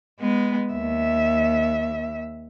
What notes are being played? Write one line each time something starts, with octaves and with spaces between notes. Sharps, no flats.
G#3 B3
D#2 E5